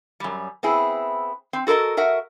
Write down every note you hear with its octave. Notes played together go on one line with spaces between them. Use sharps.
F#2 G3
B3 C4 E4 G#4
C4
F#4 A4 A#4 C5 D#5
F#4 A#4 E5 F#5